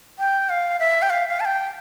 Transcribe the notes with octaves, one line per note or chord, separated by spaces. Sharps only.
G5
F5
E5
G5
F5
F5
A5
G5